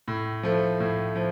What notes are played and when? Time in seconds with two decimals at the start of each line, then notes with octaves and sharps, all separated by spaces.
0.08 A2
0.43 F3 A3
0.80 A2
1.16 F3